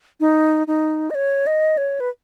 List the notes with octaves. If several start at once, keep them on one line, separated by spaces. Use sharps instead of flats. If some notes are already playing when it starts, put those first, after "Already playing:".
D#4
D#4
D#5
C#5
D#5
C#5
B4